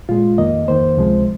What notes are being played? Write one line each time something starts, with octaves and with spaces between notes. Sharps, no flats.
A#2 G#3 F4
F2 D#3 A#3 D#5
F2 D#3 A#3 C5
C#2 C3 F3 G#3